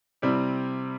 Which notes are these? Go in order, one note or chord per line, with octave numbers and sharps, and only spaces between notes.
C3 G3 C4 E4